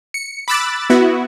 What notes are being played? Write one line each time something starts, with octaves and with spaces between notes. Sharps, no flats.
C#7
B5 D6 E6 F#6 A6
B3 E4 F#4